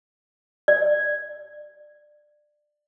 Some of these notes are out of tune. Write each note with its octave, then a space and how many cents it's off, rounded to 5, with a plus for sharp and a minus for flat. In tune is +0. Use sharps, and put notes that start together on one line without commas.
D5 +20